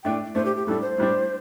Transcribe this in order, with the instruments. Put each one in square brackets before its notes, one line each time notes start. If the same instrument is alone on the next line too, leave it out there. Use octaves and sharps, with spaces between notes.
[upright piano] A2 A3 D4 [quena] G5
[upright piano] A2 A3 D4 [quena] C5
[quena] G4
G4
[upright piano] A2 G3 D4 [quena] A4
[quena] C5
[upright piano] A2 G3 D4